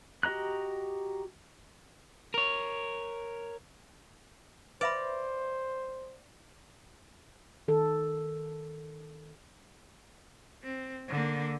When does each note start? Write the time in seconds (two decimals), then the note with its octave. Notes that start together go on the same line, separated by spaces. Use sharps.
0.23 F#4 G4 D#5 A#5 F#6
2.34 A#4 C#5
4.81 B4 C5 D5 E5 B5
7.68 D#3 A4
10.63 C4
11.08 D3 A#3